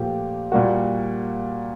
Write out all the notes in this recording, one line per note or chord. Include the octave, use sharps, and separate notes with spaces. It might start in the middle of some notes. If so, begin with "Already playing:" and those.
Already playing: A#2 F3 A3 G4
A#2 G3 A#3 F#4